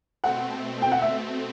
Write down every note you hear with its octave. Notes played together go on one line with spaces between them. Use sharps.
B2 A3 C4 F#5
G5
F#5
E5